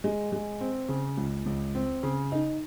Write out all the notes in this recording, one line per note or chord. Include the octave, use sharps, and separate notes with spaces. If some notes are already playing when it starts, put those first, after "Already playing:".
G#3
G#3
C4
C#3
C#2
C#2
C4
C#3
D#4